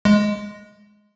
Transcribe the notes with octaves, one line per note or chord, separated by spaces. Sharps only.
G#3